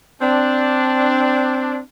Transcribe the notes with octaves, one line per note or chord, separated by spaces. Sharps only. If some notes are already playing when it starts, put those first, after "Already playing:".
C4 D4